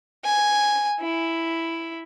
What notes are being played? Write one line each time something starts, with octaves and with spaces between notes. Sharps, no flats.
G#5
E4